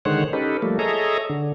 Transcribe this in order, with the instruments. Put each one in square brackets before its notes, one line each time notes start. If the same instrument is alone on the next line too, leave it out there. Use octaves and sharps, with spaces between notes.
[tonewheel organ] D3 D#3 G#3 C5 C#5 F#5
C#4 D#4 G4 A4 B4
F3 G3 A3 A#3
G#4 A4 C#5 D#5 E5 A#5
D3